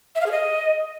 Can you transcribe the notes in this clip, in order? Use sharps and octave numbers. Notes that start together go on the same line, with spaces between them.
E5
F5
G#4
D#5